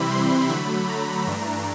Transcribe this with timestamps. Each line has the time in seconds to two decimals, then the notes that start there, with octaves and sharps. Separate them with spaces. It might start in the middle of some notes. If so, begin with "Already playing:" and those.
Already playing: C3 E3 G3 C4 E4 B5
0.10 C6
0.49 D3 F#3 A3 B5
0.89 A#5
1.27 G2 E3 A3 D4